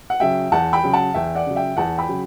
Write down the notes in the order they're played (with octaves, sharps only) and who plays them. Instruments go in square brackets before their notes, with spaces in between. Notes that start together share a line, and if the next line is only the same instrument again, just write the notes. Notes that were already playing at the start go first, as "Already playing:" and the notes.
[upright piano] F#5
C#3 F#3 E5 G5
E2 F#5 A5
G5 B5
C#3 F#3
F#5 A5
E2 E5 G5
D5 F#5
C#3 F#3
E5 G5
E2 F#5 A5
G5 B5
C#3 F#3